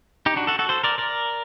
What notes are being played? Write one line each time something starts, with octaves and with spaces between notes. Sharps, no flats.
D#4 G4
D4 F#4
F#4 A4
F#4 A4
A4 C5
A#4 D5
A#4 D5